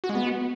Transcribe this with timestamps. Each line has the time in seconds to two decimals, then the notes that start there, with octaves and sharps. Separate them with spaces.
0.04 F#4
0.09 G#3
0.15 B3